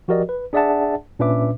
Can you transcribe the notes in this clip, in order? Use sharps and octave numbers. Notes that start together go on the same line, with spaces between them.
F3 F#4 G4 A#4 D5 D#5
B4
D4 G#4 D5 E5 F#5 A5
A#2 C#4 D4 B4 E5 D6